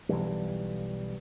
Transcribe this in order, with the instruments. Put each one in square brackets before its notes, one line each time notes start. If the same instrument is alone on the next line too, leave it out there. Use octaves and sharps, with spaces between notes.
[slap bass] B1 E3 G3